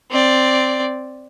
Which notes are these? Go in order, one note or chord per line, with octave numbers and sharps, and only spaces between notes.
C4 D5